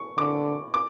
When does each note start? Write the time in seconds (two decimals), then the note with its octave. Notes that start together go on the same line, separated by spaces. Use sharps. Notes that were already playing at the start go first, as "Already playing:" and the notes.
Already playing: C#6
0.17 D3 D6
0.74 D6